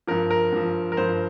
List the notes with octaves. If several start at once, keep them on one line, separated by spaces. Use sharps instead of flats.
G2 F3 A#4
A#4
G2 F3
A#4
G2 F3 C5